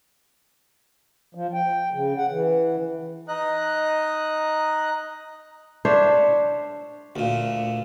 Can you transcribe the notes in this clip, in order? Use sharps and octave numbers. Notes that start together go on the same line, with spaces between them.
F3
G5
C#3
F#5
E3
D#4 D#5 F#6
D4 C5 C#5 E5
D2 A#2